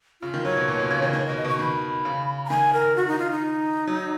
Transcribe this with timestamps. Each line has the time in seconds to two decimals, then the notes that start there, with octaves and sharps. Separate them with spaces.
0.22 C#3 F4
0.34 D#3
0.45 F#3 C#5
0.57 B2
0.68 A#2
0.79 B2
0.91 C#3
1.02 D#3
1.13 D#3 C#5
1.26 D#5
1.29 B2
1.37 D#5
1.44 B2 C#6
1.59 D#3 B5
2.05 C#3
2.45 A#5
2.50 D#3 G#5
2.73 A#4
2.96 F#4
3.07 D#4
3.19 F4
3.31 D#4
3.87 F#3